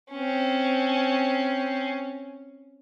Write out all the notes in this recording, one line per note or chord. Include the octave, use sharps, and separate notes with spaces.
C4 C#4